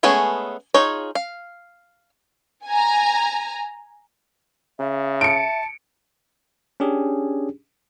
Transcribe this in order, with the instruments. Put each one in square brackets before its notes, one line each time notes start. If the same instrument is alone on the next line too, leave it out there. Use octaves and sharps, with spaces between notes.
[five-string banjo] G#3 A3 B3 C#4 G#4
D#4 F4 G#4 C#5
F5
[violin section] G#5 A#5
[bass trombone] C#3 [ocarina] E5
[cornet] A5 [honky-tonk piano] C#7 D7
[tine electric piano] C#4 D4 G4 G#4